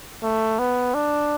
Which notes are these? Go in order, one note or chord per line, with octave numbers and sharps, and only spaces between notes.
A3
B3
D4